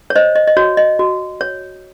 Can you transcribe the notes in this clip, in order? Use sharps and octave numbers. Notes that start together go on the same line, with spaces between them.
C#5
C5 D#5
D#5
D#5
F#4 C#5
D#5
F#4
C#5